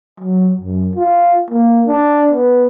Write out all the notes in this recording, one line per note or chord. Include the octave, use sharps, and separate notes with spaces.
F#3
F#2
F4
A#3
D4
B3